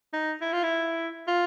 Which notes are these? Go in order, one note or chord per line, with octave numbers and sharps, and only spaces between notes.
D#4
E4
F4
E4
F4